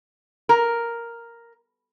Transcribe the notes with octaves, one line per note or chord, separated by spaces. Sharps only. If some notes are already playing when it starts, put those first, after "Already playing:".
A#4